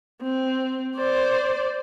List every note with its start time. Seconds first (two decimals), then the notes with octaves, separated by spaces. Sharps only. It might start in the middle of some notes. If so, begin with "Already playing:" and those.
0.23 C4
0.96 C5 D5